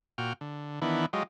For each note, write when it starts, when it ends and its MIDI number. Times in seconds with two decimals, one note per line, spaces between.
0.18 0.33 46
0.18 0.33 66
0.18 0.33 79
0.18 0.33 89
0.41 0.80 50
0.82 1.06 51
0.82 1.06 52
0.82 1.06 59
0.82 1.06 62
0.82 1.06 64
1.13 1.23 54
1.13 1.23 56
1.13 1.23 65
1.13 1.23 67
1.13 1.23 75